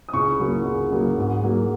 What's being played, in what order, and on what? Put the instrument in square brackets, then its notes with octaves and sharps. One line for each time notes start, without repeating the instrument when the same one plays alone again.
[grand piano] D#6
C#2 C#6
C#3 F#3 A#3
C#2
C#3 F#3 A#3
G#2
F#3 A#3